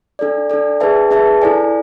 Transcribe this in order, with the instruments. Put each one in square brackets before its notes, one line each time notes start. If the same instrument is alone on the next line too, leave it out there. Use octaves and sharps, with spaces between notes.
[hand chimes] D4 A4 D5
D4 A4 D5
D4 G#4 B4 E5 A5
D4 G#4 B4 E5 A5
E4 A4 D5 G#5